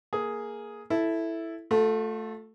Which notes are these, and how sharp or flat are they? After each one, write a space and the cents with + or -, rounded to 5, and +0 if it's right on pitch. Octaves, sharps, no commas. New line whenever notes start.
A#3 +0 G#4 +5
E4 +0 A4 +0
A3 +0 F4 +45 A4 +0